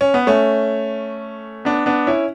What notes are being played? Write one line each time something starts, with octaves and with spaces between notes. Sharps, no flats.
C#4
B3
A3 C#4
B3 D4
B3 D4
C#4 E4